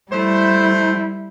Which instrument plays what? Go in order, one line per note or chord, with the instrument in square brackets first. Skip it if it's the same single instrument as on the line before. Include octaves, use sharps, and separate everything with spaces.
[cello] G3 E4 [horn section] A3 C5